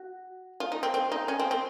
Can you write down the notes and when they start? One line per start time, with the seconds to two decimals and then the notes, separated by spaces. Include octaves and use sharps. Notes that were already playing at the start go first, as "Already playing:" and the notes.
Already playing: F#4
0.60 F4
0.72 D#4
0.83 C4
0.94 C4
1.12 D#4
1.28 C#4
1.40 C4
1.51 C4